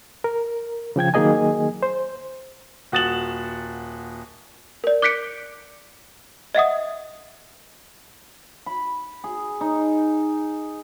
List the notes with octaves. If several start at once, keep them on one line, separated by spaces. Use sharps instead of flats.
A#4
C#3 F3 G5 G#6
D#3 F#3 A#3 G#4 D#5 G#5
C5
D#1 F#4 D#6 A6 E7 F#7
A#4 D5
D6 F#6 G6 B6 C#7 D7
D#5 E5 F#5 D#6
B5
G#4
D#4